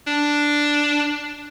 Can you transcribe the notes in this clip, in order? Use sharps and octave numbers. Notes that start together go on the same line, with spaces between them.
D4